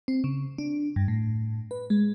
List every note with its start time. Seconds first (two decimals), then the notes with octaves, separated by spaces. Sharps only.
0.08 C4
0.24 C#3
0.58 D4
0.96 G2
1.08 A2
1.71 B4
1.90 G#3